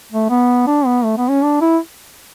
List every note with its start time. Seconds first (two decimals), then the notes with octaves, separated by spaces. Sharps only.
0.12 A3
0.30 B3
0.67 D4
0.86 B3
1.04 A3
1.17 B3
1.30 C#4
1.43 D4
1.61 E4